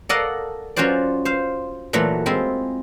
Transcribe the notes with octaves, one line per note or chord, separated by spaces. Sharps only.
A4 A#4 D5 D#5 F5 F#5
F#3 C#4 F4 F#4 C5 D5
C5 F5
A#2 E3 F#3 A3
G#3 C4 E4 F4